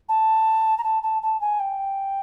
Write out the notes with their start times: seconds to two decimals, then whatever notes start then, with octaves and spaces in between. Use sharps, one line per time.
0.09 A5
0.78 A#5
0.84 A5
1.03 A5
1.23 A5
1.41 G#5
1.60 G5